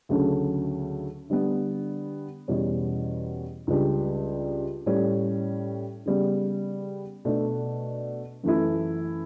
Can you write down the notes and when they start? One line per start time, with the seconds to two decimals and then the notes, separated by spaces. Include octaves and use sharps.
0.09 D2 C#3 F#3 A3 C#4
1.30 D3 G3 B3
2.48 E2 B2 G3 C#4
3.67 C#2 C#3 G3 D4 G4
4.86 A2 G3 C#4
6.06 C#3 G3 B3
7.25 B2 A3 D4
8.43 F#2 E3 A3 E4